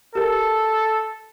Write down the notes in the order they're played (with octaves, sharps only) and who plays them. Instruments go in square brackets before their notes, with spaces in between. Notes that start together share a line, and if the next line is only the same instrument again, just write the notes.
[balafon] G4 A#4 [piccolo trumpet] A4